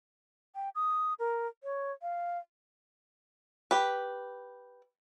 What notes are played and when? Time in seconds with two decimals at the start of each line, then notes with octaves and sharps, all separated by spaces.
0.55 G5
0.75 D#6
1.19 A#4
1.64 C#5
2.02 F5
3.71 G4 B4